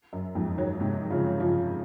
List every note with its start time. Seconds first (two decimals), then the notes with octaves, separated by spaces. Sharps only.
0.13 F#2
0.35 F2 G#2
0.58 D#3 F#3
0.80 G#2 C3
1.10 C#3 F3
1.40 C#3 F3